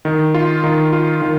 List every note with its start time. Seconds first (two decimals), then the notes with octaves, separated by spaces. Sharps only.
0.05 D#3
0.34 F4
0.64 D#3
0.93 F4
1.22 D#3